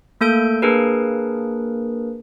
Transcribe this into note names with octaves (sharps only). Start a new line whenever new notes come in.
A3 A#3 A4 G6 D7
A#3 D4 G#4 A#4 B4